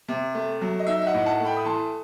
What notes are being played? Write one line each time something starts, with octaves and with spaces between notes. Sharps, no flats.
C3
A3
F#3
D#5
D#4 E5
E5
D#5 F#5
A2
F#5 A5
A3
G5 B5
D#6
E3 A5 C6